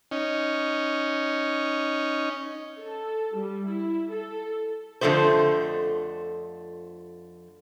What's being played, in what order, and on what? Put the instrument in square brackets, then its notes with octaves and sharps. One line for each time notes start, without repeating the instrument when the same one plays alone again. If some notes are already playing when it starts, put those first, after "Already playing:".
[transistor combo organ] C#4 D#4
[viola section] A4
G3
E4
A4
[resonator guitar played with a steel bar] F2 D3 F3 A3 B3 C5